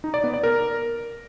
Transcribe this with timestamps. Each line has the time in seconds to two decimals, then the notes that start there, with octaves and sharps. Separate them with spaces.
0.04 D#4
0.14 D5
0.24 B3
0.34 D5
0.43 A#4